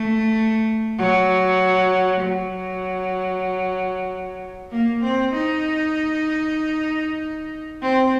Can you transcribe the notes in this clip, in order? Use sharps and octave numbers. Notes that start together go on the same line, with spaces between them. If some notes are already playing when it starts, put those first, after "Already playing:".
Already playing: A3
F#3
F#3
A#3
C4
D#4
C4